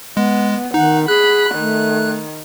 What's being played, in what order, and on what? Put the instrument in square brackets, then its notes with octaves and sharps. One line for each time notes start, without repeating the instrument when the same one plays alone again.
[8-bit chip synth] G#3 [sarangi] B3
[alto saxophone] D#3 [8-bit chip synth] D#4 [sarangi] F#5
[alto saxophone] G#4 [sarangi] B5 [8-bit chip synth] F#6
[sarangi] D#3 [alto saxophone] A3